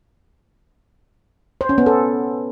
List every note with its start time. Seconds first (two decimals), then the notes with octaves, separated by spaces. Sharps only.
1.61 C5
1.69 C#4
1.78 B3
1.86 A4